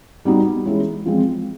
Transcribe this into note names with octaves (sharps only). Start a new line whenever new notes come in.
G3 B3 D#4 F#4
E3 G#3 C#4 E4 G#4
F3 G#3 C4